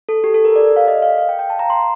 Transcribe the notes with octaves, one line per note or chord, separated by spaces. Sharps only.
A4
G4
A4
A#4
D5
F5
D#5
F5
F5
G5
G5
A5
A#5
C6